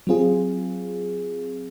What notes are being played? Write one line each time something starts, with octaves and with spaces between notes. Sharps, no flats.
F#3 C4 F4 G#4